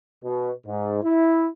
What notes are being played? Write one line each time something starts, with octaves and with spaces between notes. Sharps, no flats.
B2
G#2
E4